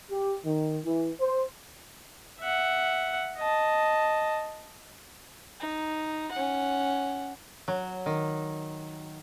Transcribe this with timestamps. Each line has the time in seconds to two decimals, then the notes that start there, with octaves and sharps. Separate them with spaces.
0.11 G4
0.45 D#3
0.85 E3
1.20 C5
2.40 E5 F#5
3.37 D#5 A5
5.60 D#4
6.32 C#4 F#5
7.68 F#3
8.06 D#3